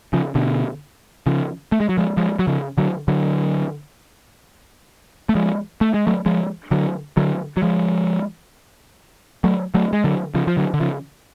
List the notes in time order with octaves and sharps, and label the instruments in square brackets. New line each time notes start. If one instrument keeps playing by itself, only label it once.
[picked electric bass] C#3 F3
B2 D3
C#3 F3
A3
G#3
F#3
F3 G#3
F3 G#3
F#3
C#3 F3
D3 F#3
D3 F#3
A3
F3 G#3
A3
G#3
F#3 A3
F3 G#3
D3 F#3
D3 F#3
F#3
F3 G#3
F#3 A3
F#3 A3
G#3
D3 F#3
C#3 F3
F3
D3 F#3
D3
C#3 F3